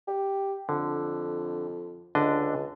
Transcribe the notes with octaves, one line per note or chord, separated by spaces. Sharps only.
G4
F2 D3
C#2 D3 D4 D#5